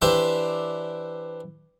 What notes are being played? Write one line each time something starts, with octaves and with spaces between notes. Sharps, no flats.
E3 D4 G4 C5 D5 E5